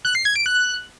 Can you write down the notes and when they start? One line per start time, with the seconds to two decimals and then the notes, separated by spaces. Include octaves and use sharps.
0.05 F#6
0.15 C7
0.25 G#6
0.36 D7
0.46 F#6